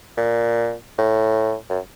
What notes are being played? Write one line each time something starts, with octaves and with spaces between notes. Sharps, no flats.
A#2
A2
F#2